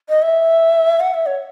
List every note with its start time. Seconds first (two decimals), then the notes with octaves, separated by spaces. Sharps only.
0.09 D#5
0.22 E5
1.00 F#5
1.14 E5
1.26 C#5